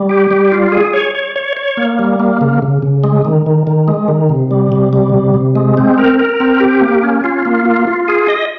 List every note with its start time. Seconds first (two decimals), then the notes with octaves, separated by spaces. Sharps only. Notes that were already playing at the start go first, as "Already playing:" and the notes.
Already playing: G3
0.09 G4
0.31 G3
0.52 F4
0.72 G#4
0.93 C#5
1.15 C#5
1.36 C#5
1.57 C#5
1.77 A#3
1.99 G3
2.20 A#3
2.41 C#3
2.62 C#3
2.82 C#3
3.04 G#3
3.25 D#3
3.46 D#3
3.67 D#3
3.88 G#3
4.08 D#3
4.29 C3
4.51 G3
4.72 C3
4.93 G3
5.14 C3
5.34 C3
5.55 G#3
5.77 C4
5.98 A#4
6.19 A#4
6.40 C4
6.60 G4
6.81 A#3
7.03 C#4
7.24 F4
7.45 A#3
7.65 F4
7.87 F4
8.08 G#4
8.28 D#5